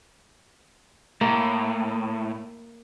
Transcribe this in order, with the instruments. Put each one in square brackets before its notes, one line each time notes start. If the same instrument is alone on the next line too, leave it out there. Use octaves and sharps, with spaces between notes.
[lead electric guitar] A2 [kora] A#3